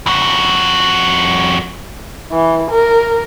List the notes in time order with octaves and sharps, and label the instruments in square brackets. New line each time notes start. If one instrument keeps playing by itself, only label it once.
[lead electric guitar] F2 F#4
[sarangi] E3
A#4